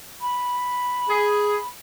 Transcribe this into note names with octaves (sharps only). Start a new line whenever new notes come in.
B5
G#4